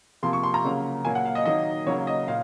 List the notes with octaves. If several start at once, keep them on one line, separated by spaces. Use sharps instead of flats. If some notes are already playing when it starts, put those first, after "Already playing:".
C3 F3 A#3 C6
C#6
C6
A#5
C#3 F#3 A#3
A#2 F#3 A#3 G#5
F#5
F5
D#5
D#3 F#3 A#3 D#5
C#3 F#3 A#3 C#5
D#5
A#2 F5